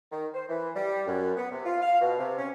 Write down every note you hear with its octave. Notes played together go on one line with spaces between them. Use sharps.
D#3
C5
E3
G3
F#2
B3
C3
F4
F5
B2
C3
C#4